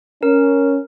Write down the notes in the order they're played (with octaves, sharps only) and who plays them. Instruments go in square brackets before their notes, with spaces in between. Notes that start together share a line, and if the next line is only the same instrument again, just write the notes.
[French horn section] C#4 [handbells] A#4